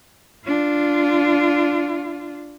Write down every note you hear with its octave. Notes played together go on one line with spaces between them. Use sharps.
D4 F4